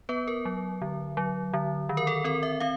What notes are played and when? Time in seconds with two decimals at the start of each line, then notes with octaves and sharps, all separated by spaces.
0.09 B3 B4
0.28 A#4
0.45 F#3
0.82 D3
1.17 F#3
1.53 D3
1.89 D#3
1.97 A#4
2.07 A4
2.24 C4 A#4
2.43 E5
2.60 C4 F5